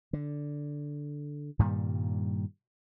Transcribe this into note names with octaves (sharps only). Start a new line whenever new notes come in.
D3
G2 A#2 D#3 G3